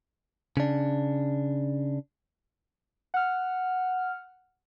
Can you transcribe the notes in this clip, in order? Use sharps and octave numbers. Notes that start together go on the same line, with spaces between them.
C#3 D4
F#5 F6